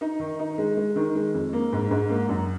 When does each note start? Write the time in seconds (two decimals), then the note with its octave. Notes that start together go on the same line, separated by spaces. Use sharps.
0.01 D#4
0.20 D#3
0.39 D#4
0.58 G#3
0.77 G#3
0.96 D#3
1.15 G#3
1.34 F2
1.53 A#3
1.73 G#2
1.91 G#2
2.10 A#3
2.29 F#2